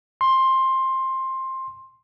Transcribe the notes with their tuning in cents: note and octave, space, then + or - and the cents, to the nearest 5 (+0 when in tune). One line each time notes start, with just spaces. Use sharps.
C6 +15